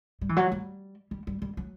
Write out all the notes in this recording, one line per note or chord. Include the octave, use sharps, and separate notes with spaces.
G3
E3
F#3
G3
G3
G3
G3
F#3